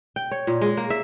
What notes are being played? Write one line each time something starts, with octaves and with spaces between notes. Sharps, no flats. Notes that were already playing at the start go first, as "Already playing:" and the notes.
G5
C#5
A#2
G#3
A#3
E5